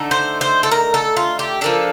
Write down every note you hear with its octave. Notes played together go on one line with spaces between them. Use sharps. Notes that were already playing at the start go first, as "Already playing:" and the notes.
Already playing: D3 A3 D#4
C5
C5
A4
A#4
A4
F4
G4
F3 A#3 D4 A4